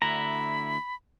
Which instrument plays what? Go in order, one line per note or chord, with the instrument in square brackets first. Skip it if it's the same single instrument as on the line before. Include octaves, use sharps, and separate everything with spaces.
[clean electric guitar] D2 D3 E4 [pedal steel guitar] A#5 [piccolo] B5